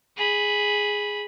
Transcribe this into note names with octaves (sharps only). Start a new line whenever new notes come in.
G#4 B5